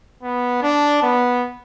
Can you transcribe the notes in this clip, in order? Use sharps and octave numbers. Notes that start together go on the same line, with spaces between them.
B3
D4
B3